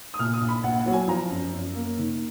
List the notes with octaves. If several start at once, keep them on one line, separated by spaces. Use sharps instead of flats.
D#6
A#2 F6
D#6
A#1
B5
A#1 F#5
F#5
F#3
G#5
F3 A#5
F#2
F#2
A#3
D#3